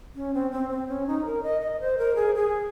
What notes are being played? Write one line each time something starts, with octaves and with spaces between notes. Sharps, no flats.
C#4
C4
C4
C4
C#4
D#4
A#4
D#5
D#5
C5
A#4
G#4
G#4